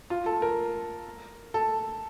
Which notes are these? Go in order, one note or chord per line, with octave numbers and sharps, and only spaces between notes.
F4
A4
A#4
A4